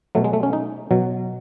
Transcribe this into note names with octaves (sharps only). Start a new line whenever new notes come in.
B2 F#3 A3
G#3
A3
C#4
D#4
B2 F#3